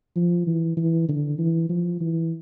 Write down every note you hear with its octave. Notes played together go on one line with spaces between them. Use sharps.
F3
E3
E3
D3
E3
F3
E3